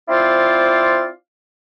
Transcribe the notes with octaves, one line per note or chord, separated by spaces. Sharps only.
C4 E4 F4 C5 D5 F5